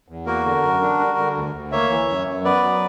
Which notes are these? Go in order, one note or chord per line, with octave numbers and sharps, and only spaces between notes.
E2
A#3 F#4 A#4
D3
F#2
D4
G3
D3
D2
D2
A#3 C#5 E5
E3
F#2
F#2
B3 B4 D5
F#3